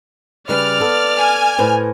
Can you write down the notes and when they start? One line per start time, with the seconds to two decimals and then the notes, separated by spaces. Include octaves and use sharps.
0.49 C#3 G3 B4 D5 F6
0.80 B3 A4
1.19 G#5
1.58 A2 B4 C5